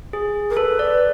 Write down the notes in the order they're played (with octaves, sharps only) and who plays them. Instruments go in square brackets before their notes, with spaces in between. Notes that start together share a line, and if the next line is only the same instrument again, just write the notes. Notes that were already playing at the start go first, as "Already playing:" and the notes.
[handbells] G#4
[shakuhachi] A#4
[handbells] A4 [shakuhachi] B4
[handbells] D5